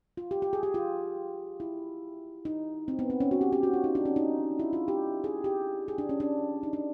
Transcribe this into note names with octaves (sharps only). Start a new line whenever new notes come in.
F4
G4
G4
G#4
G4
F4
E4
D#4
C4
B3
C4
C#4
F#4
G4
G4
F#4
F4
D#4
D4
C#4
D#4
E4
F4
G4
G#4
G4
G#4
D4
C#4
D4
D#4
D4